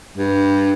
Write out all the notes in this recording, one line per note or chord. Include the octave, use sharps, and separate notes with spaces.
G2